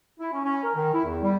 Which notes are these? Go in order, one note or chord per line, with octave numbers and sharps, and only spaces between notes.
E4
C#4
C#4
A#4
D#3
E4
E2
G3